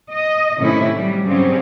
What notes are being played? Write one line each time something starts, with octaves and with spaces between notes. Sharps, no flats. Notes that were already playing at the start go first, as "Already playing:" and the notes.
D#5
A2 C3 D#3 A3 C#4 E4
F#3 G3
G2 C#3 F#3 C4 C#4